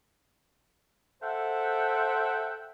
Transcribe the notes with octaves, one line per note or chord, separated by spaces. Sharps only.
A4 C5 E5 F#5 G5